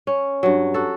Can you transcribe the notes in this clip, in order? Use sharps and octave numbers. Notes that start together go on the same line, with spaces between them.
C#4
G2 F#3
F#4 A4